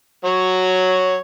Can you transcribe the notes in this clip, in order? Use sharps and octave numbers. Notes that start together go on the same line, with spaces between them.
F#3 C#5